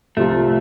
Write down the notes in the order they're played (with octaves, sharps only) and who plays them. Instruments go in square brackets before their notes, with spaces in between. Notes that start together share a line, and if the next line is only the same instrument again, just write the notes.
[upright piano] C2 C3 F3 C4 F4 [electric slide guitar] A3